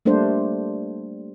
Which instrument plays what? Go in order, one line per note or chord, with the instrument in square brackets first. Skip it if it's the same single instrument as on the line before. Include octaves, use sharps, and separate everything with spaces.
[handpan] G3 A3 A#3 D4 C5